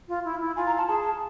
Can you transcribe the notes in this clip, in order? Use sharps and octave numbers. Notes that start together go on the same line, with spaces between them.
F4
E4
E4
F4 G#5
A#5
A5
G#4 A5
A5